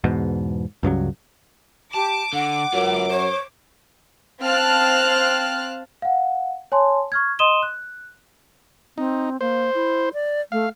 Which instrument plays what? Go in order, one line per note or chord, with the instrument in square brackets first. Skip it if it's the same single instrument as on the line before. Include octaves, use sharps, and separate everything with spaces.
[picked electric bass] E2 G#2 B2
C#2 G2 C#3 F#3
[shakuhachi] G4 [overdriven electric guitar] A5 [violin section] D6
[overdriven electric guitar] D3 [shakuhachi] F#5
[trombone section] F#2 F#3 [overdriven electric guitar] F4 B4
[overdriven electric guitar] C5 [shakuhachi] C#5
[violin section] C4 F5 A5 F6 F#6
[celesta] F5 F#5
C#5 G#5 A5 C6
C#6 F6 G#6
D#5 C6 D#6 D#7 E7 G7
F#6
[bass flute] C4 [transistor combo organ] D#4
[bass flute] A#3 [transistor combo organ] C5
[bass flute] E4
D5
[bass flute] A3 [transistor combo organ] F5